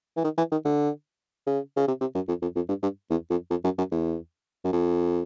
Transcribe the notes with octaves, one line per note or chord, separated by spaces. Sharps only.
E3
D#3
E3
D#3
D3
C#3
C#3
C3
C3
F#2
F2
F2
F2
G2
G2
E2
F2
F2
F#2
F#2
E2
F#2
F2